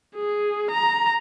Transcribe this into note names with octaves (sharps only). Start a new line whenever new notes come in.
G#4
A#5